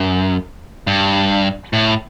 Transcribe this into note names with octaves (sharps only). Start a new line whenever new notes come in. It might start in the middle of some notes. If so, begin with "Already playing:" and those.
Already playing: F#2
G2
A2